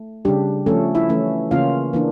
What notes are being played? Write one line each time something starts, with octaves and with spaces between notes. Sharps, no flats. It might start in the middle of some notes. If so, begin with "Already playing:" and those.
Already playing: A3
C#3 G3 D4 G4
F3 A3 C#4 A4
E4 E5
E3 A3 C#4
C#3 E3 A#3 C#4 F4 F5
E3 A#3 D4